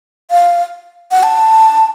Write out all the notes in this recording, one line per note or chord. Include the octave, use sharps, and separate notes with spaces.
F5
F#5
A5